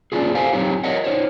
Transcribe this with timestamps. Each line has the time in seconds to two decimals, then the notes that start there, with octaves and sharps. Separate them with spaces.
0.12 A#3 C#4 D4 E4 F4 G#4
0.35 G4 A4 C5 F5 F#5 G#5
0.53 F#3 C4 D#4 E4 G4 C#5
0.84 A#4 C#5 D#5 F#5
1.04 D#4 E4 C5 C#5